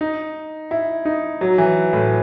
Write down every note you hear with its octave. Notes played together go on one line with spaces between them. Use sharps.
D#4
E4
D#4
F#3
E3
A2